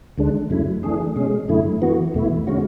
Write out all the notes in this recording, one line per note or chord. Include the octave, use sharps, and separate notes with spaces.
D2 D3 G#3 D4
F#2 C#3 F#3 A3 E4
E3 A3 D4 G#4
B2 G#3 C#4 G#4
F#2 D3 A3 E4
E3 B3 F#4
E2 B2 A3 E4
D3 G#3 C#4 F#4